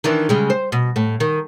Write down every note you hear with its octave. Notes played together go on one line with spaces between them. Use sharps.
D#3 E3 D4
C#3 G3 G#3
C5
B2
A2
D#3